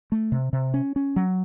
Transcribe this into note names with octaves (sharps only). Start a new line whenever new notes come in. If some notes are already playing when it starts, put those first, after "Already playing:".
A3
C3
C3
C#4
C#4
F#3